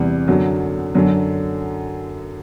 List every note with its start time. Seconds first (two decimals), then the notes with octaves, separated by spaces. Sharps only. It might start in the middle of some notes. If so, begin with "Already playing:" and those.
Already playing: E2 C3 E3 G3
0.28 F#2 D3 F#3
0.95 F#2 D3 F#3